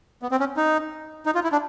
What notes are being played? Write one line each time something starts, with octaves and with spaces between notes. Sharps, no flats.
B3
C4
C#4
D#4
D#4
F4
E4
D4